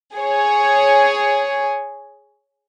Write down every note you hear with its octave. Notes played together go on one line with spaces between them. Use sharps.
G#4 C#5